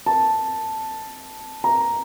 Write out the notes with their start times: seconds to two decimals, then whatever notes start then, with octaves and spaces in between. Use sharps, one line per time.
0.06 A5
1.64 A#5